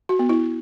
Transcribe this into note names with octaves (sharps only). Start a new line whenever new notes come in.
F#4
B3
E4